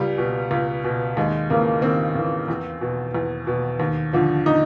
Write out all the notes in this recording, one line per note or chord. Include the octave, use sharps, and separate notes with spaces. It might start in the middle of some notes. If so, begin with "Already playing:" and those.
Already playing: C#2 G3
B2
C#2
B2
D#2 G#3
C#3 E3 A#3
D#2 C4
C#3 E3
E2
B2
E2
B2
D#2
D3 F3
D#4